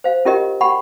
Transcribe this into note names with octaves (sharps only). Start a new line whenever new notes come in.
C5 F5
C#4 F4 G4 A#4 D#5
F#5 G5 B5 C#6